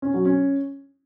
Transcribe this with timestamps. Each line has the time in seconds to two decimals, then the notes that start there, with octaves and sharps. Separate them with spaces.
0.02 C#4
0.14 F#3
0.25 C#4